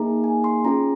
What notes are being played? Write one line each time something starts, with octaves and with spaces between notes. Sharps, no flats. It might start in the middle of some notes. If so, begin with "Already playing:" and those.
Already playing: A#3 D#4 G#4 A#5
G#5
C6
C#4 F4 G#4 A#5